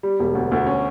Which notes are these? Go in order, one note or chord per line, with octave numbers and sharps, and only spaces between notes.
G3
E1
D2
D2
C#4